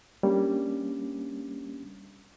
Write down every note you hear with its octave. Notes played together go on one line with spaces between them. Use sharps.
G3 A#3 C#4 D4